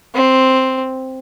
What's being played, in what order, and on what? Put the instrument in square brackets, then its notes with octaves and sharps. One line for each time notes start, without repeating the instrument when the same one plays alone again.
[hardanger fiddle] C4